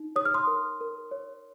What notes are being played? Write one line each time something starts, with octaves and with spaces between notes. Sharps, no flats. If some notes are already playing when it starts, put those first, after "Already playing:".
Already playing: D#4
C#5 D#6
F6
C6 D#6
A#4
A#4
C#5